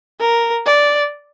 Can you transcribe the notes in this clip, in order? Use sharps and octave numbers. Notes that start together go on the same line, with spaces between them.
A#4
D5